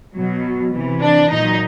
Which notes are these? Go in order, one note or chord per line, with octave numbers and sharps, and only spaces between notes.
B2 F#3
C3 E3
D4
A#2 F#3 D#4